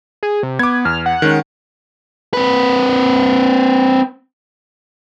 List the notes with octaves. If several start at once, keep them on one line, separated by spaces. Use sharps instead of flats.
G#4
C3
B3 D6 G#6
E2 F6
F#5
D#3 G#3 C#4
C4 B4